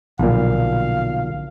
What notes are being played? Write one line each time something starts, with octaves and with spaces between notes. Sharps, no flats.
B1 A#2 D3 F3 F5